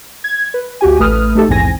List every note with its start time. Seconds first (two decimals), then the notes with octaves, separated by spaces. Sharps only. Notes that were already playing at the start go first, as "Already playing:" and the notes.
0.24 G#6
0.54 B4
0.81 D2 F#4 G4 G#5
0.99 A1 A3 B4 D#6 F6
1.35 A3 D#4 G4 A4
1.49 A#1 E2 G#2 C4 G#5 A#6